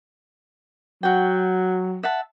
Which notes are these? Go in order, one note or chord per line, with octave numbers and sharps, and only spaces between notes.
F#3 F#4 G5
E5 F#5 A5